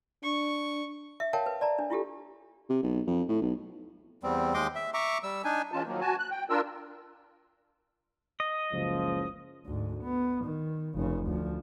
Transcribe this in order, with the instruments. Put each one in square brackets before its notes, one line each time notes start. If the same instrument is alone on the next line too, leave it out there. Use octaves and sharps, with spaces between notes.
[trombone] D4 [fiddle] C#6
[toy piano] E5
A#4 C#5 F5 G5 A5
B4
D5 A5 A#5
D4
E4 F4 G4 A4
[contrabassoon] C3
B1
F2
A2
B1
[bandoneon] E2 G3 C4
D#2 G#3 D#5 G5 C6 D6
E5
E5 A#5 C#6 D6
G3 E6
D4 D#4 G#5
[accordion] E3 G#3 C#4 F4 A5
D#3 F3 F#3 A#3
F#4 G#5 A5
F#6
G5
D4 F4 A#4 E6
[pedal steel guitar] D#5
[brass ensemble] F#1 C#2 F3
[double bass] D2 G#2
B3
D#3
F1 C#3
D2 F3